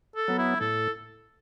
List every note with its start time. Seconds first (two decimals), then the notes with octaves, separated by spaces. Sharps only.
0.16 A4
0.28 F#3 B3
0.38 E4
0.60 A2 A4